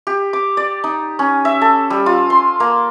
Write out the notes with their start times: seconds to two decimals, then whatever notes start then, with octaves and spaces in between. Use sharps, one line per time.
0.07 G4
0.33 D6
0.57 D5
0.84 D#4
1.19 C#4
1.45 E5
1.62 A4
1.90 G3
2.06 F4
2.30 C6
2.60 A#3